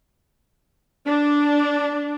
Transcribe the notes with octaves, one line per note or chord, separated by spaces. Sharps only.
D4